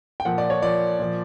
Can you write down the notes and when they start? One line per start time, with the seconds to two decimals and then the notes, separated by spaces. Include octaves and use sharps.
0.20 G5
0.25 A#2 F3 F#5
0.38 D5
0.50 C#5
0.62 A#2 F3 D5
0.99 A#2 F3